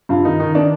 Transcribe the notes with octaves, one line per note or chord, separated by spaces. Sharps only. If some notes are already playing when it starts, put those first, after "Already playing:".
G2 F4
D#3 D#4
D#3 D#4
D#3 D4